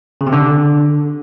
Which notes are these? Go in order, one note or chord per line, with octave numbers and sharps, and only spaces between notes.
C#3
C3
D3